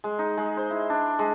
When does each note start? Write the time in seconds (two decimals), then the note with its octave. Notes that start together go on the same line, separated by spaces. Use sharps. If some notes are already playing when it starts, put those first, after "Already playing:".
0.04 G#3
0.19 D#4
0.37 G#3
0.57 C5
0.70 E4
0.90 D4
1.19 G#3